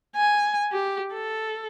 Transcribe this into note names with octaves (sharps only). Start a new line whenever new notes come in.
G#5
G4
A4